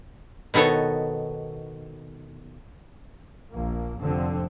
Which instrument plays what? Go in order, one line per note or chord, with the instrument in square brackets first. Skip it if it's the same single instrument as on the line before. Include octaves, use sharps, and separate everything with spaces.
[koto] B2 D#3 B3 A4 C#5
[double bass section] A#1 A#3
F1 D3 F3 C4